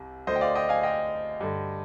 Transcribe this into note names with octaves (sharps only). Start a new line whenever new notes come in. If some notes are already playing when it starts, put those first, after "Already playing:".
Already playing: C2 C3
D2 D3 C5 D#5
G5
D5 F5
D#5 G5
F5 G#5
D#5 G5
G2 D3